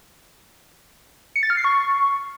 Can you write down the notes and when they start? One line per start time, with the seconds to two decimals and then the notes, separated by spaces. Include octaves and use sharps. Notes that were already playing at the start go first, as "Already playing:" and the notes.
1.36 C#7
1.43 A6
1.50 F6
1.57 C7
1.64 C#6